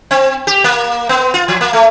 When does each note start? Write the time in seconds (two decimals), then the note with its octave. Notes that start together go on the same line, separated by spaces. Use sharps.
0.11 C4
0.47 G4
0.64 A#3
1.09 B3
1.34 F4
1.48 F3
1.61 A#3
1.73 A3